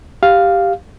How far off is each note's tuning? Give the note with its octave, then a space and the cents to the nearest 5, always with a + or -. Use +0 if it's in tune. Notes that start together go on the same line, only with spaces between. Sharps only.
G4 +0 F5 +0